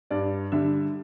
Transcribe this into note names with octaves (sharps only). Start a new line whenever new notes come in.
G2 D5
D3 G3 E5